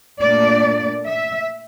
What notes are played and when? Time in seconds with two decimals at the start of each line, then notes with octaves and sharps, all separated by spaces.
0.21 A#2 A3 D4 D5
1.08 E5